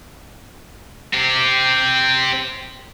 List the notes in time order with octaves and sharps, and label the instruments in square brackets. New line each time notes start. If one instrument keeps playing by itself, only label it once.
[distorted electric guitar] C4 G4